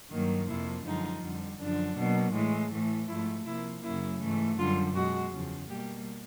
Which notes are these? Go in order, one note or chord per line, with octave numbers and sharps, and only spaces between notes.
G2 D#3 F#3 A#3
F2 C3 F3 A#3 E4
F#2 D3 F3 G#3 D#4
F2 D3 G3
F#2 D3 F3 D4
B2 F#3 A#3
A2 E3 G#3
A2 E3 A3
G#2 F3 A3 E4
C3 F3 A#3 E4
F#2 C#3 F#3 A#3 E4
G#2 E3 A3
F#2 D3 G3 F4
B2 G#3 F#4
E2 C#3 F3
B2 G3 A#3 G4